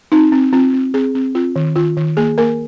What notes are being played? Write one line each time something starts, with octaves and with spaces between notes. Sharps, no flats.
C4 D#4
C4
C4 F4
C4
C4 G#4
C4
C4 F4
D#3
D#3 F4
D#3
A#3 G#4
A#3 A#4